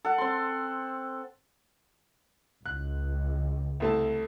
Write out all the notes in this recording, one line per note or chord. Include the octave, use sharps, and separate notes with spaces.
A4 F#5
C4 C6
C#2 F#6
C2 A3 A5